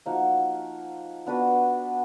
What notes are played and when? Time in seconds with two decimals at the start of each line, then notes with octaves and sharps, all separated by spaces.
0.06 F3 A#3 D#4 F#4
1.27 B3 D4 F#4 B4